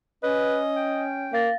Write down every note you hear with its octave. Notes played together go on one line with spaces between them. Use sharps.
C#4 B4 D#5
G5
A#3 F5 A6 A#6